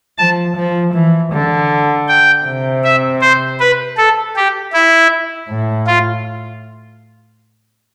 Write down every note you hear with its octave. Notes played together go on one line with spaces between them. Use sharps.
F3 A5
F3
E3
D3
G5
C3
E5
C5
B4
A4
G4
E4
A2
F4